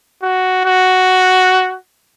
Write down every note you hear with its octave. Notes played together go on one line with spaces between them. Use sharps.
F#4
F#4